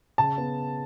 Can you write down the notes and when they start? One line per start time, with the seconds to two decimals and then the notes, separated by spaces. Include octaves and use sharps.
0.18 C#3 A5
0.38 B3